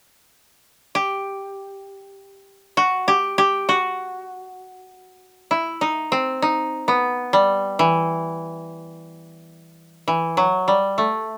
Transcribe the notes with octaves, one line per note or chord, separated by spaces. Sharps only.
G4
F#4
G4
G4
F#4
E4
D#4
C4
D#4
B3
G3
E3
E3
F#3
G3
A3